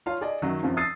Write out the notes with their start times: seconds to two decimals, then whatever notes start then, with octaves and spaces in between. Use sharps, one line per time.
0.06 F4 C#5 F5
0.21 G#4 D5 D#5
0.42 F#2 D#3 F#3
0.63 F#2 C3 F3
0.77 D#6 E6 A6 C7